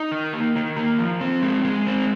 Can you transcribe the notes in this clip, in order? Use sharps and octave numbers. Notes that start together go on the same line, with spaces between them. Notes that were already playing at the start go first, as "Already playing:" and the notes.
Already playing: D#4
D#3
A#3
D#3
A#3
F3
C4
G#3
G#3
C4